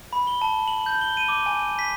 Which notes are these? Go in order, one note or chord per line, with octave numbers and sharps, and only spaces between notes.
B5
G7
A5
F#7
G6
G7
D#7
D6
G#5
B6